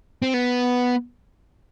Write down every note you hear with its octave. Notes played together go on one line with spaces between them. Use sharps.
C4
B3